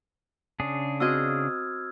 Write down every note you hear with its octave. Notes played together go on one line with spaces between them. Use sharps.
C#3 D4 G#4
C4 F#4 D#5 E6 F6 G#6